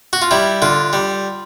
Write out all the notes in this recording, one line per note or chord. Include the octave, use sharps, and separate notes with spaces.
F#4
F4
G3 E4
D3 F4
G3